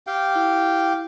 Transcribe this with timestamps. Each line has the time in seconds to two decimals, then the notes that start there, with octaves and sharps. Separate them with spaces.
0.07 G4 F5 G5
0.35 E4